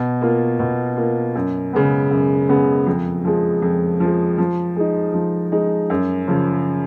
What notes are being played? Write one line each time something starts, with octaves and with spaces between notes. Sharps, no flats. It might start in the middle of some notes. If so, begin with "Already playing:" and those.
Already playing: B2
A#3 F4
B2
A#3 F4
F#2
C#3 G#3 B3
F#2
C#3 G#3 B3
F2
F3 G#3
F2
F3 G#3
F3
G#3 D#4
F3
G#3 D#4
F#2
C#3 F3